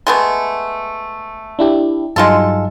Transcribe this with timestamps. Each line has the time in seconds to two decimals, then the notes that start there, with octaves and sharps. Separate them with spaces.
0.07 G#3 A3 B3
1.59 D4 E4 G4
2.16 G2 F#3 G#3 D#4 F4 A4